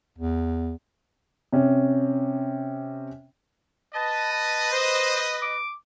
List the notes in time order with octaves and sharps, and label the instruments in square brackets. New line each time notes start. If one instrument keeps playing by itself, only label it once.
[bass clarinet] E2
[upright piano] C3 C#4
[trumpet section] B4 D#5 [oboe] A5
[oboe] A5
C5
D6